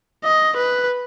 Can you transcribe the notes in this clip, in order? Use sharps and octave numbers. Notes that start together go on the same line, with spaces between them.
D#5
B4